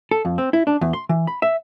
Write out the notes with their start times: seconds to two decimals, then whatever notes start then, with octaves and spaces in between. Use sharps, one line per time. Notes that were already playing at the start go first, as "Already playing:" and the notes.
0.11 A4
0.25 F2
0.38 C4
0.53 E4
0.67 D4
0.81 E2
0.93 C6
1.09 E3
1.27 B5
1.42 E5